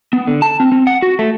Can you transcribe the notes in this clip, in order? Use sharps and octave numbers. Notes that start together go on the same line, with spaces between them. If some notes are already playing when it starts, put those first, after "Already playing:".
B3
D3
A5
C4
C4
F#5
F#4
A3